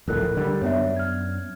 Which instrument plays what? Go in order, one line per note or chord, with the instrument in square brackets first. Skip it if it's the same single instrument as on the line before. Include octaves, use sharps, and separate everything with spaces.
[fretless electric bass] D1 A#1 A2 [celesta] A4 A#4 F#6
[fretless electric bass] D3 G3
[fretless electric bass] F#2 B3 D4 [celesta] C#5 E5
[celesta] F6 G#6